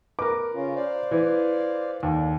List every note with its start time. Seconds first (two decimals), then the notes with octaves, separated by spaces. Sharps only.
0.19 A#4 B4 D6
0.54 C#3 C#4 F4
0.75 C5 D5 F5
1.11 E3
2.03 D#2 D3